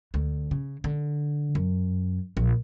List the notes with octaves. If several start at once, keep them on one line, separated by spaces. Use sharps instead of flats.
D2
C#3
D3
F#2
A#1